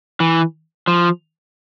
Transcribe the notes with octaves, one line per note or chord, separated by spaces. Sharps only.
E3
F3